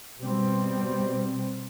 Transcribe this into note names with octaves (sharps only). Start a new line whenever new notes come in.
B2 G3 C4